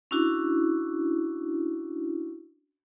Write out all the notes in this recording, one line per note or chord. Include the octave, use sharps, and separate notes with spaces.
C#4 D4 E4 F#4